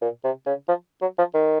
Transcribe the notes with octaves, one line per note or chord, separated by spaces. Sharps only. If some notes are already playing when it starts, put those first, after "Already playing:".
A#2
C3
C#3
F3
F#3
F3
D#3